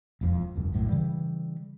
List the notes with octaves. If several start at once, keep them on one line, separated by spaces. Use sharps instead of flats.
E1 F2 F3
E1 C#2 F#2
F#1 B1 F#2 A2
C#3 E3 G3